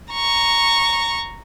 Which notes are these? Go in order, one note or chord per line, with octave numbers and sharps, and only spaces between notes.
A#5 C#6